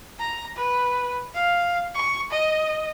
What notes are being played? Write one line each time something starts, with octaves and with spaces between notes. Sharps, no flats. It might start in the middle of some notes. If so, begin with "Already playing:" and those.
A#5
B4
F5
C#6
D#5